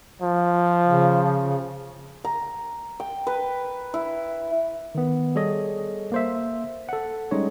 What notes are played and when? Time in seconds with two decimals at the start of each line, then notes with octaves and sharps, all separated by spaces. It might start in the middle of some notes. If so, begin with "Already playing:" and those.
0.22 F3
0.85 C#3
2.25 A#5
3.00 G5
3.27 B4
3.94 E4
4.95 D#3 B3
5.35 G3 G#4 A4 C#5 D#5
6.12 A#3 C5 E5
6.89 A4 F#5
7.31 G3 G#3 C#4 D#4 C#5